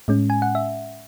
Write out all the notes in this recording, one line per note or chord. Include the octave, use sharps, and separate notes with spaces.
A2 G#3 C#4
G#5
F#5
E5